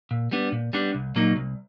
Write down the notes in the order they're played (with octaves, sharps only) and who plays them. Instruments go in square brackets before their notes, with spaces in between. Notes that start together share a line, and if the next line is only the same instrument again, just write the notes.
[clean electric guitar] A#2
G3 B3 D4
A#2
G3 B3 D4
C2
A#2 F#3 A#3 D#4
C2